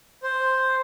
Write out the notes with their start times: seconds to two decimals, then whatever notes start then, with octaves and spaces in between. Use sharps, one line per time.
0.23 C5